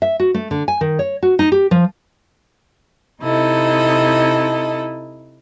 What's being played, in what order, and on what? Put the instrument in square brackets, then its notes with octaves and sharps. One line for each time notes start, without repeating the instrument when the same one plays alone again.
[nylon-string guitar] E5
F#4
A3
D3
G#5
D#3
C#5
F#4
D#4
G4
F3
[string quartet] C3 D#4 E4 A4 D#5